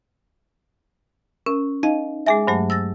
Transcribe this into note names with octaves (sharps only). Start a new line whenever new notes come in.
C#4 A#4
D#4 D#5 F5
G#3 G#4 E5 G#5 D6 A#6
G2 F#3 A3 C5
E6 A6 A#6